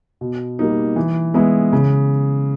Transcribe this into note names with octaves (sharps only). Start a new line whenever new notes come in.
B2
G3 A#3 D#4
E3
G#3 B3 E4
C#3